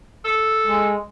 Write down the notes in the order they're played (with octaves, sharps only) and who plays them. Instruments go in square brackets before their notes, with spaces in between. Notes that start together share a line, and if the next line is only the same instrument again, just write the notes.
[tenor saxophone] A4
[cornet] G#3